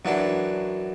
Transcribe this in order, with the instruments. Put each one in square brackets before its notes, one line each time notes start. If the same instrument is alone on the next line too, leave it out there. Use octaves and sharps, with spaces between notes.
[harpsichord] F#2 E3 D4 [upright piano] F#3 F#4